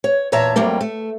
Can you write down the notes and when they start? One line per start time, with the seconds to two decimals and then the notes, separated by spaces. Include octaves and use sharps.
0.04 C#5
0.32 E2 A#2 C#5 E5 A5 A#5
0.56 F2 F#3 G3 A3 A#3
0.81 A3